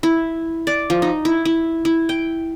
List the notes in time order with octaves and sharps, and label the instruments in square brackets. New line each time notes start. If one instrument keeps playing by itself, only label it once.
[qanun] E4
D5
F3
D#4
E4
E4
E4
G5